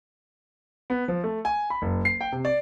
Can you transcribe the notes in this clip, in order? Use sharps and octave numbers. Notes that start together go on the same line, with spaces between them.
B3
F3
A3
G#5
B5
F#1
C7
G5
C3
D5